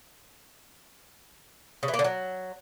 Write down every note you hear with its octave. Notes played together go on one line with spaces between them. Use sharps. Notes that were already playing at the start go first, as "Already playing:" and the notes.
C#3
E3
A#3
D3
F#3